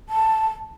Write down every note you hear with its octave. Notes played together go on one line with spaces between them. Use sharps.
A5